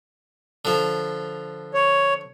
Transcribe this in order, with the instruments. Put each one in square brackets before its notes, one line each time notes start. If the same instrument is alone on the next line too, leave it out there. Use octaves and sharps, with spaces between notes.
[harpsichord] D3 F3
[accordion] C#5